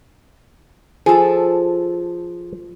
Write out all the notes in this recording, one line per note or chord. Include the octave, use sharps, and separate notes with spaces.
F3 G#4 A4